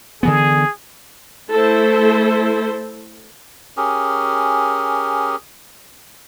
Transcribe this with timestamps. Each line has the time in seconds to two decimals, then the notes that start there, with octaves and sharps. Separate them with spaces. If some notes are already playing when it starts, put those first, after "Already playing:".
0.23 D3 E3 B3 G#4
1.51 A3 E4 A4 C5
3.77 C#4 G4 G#4 A#4